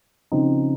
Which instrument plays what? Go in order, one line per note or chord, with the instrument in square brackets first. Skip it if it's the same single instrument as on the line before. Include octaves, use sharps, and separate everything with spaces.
[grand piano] C#3 F3 C4 D#4